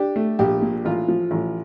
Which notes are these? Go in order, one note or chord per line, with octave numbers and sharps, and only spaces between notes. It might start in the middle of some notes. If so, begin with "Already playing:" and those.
Already playing: D4 G4
A3
A#1 G4
A#2
A1 F4
F3
A1